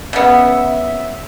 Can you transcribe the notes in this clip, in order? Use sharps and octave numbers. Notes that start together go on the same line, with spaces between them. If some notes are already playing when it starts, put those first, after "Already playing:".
C#3 B3 E5